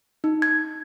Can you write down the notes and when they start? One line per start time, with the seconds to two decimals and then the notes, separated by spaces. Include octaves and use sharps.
0.24 D#4
0.42 G#6